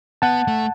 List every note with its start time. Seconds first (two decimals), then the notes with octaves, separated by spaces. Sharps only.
0.22 B3 F#5 A5
0.48 A3